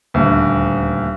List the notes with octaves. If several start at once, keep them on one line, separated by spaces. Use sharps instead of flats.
D#1 D2